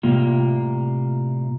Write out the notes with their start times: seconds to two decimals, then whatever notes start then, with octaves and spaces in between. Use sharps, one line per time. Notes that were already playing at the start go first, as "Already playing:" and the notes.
0.03 A2 C3 G3 A#3 F4